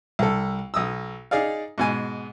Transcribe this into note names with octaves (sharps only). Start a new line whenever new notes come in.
C2 A4
B1 D#6 E6
D#4 G#4 D5 F5
G#2 B2 G#5